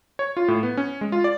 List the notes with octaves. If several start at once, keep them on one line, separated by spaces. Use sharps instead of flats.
C#5
F4
A2
B3
C#4
G#3
F4
D5